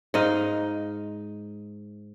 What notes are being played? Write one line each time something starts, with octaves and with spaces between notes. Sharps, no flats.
G#2 D#4 D#5 F5